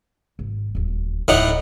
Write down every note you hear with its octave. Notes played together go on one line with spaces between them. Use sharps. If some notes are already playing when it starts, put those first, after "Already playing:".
G#1
D#1 D2
D1 F2 A2 D#4 F#5